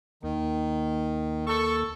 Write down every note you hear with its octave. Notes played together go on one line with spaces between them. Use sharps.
D#2 D#3 A#3
A4 C#6